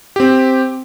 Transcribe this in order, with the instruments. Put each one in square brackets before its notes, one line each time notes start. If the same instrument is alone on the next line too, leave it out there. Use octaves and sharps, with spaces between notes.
[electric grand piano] C4 G4